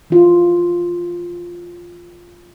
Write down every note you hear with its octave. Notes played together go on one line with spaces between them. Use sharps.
E3 F4